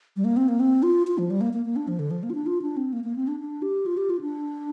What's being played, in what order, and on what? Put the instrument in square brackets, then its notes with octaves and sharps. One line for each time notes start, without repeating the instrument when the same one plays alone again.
[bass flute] G3
A#3
C4
A#3
C4
F4
F4
F3
G3
A#3
A#3
A#3
D4
F3
D3
F3
A#3
F4
D4
F4
D4
C4
A#3
A#3
C4
D4
D4
G4
F4
G4
F4
D4